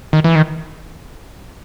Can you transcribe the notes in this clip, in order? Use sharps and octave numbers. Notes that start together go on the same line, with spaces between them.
D#3
E3
D#3